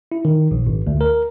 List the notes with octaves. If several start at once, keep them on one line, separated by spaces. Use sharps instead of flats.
E4
D#3
A#1
G#1
D2
A#4